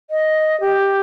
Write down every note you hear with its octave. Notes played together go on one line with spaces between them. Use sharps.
D#5
G4